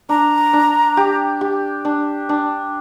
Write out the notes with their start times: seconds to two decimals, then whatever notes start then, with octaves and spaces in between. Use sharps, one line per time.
0.09 D4 A#5
0.53 D4
0.97 G4
1.41 G4
1.85 D4
2.29 D4